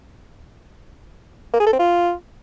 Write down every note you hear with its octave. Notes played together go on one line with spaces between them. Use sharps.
A#3
G#4
A4
C4
F4